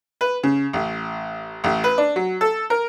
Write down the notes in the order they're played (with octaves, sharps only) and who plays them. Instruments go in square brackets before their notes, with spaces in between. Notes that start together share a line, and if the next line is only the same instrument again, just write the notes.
[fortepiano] B4
C#3
A1
A1
B4
D4
F#3
A4
A#4